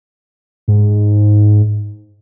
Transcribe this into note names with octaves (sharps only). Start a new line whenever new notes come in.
G#2